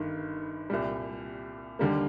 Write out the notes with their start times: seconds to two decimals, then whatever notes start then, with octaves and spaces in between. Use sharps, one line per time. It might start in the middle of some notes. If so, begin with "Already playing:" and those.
Already playing: G1 G2 D#3
0.70 C2 A#2 G3
1.79 D#2 D3 G3 A#3